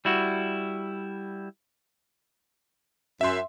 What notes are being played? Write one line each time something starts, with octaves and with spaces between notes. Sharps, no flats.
G3 E4 F#4
F#2 E5 C6